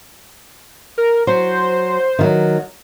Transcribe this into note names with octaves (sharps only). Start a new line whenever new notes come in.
A#4
F#3 C5
D#3 F3 F#3